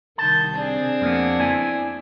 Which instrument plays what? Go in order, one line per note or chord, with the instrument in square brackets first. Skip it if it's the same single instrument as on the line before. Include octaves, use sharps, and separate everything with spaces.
[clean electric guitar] C2 A5 [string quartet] D#3 G6
[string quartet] C4 D4 G#4
[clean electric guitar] F2 A#3 B3
E4 D5 G#5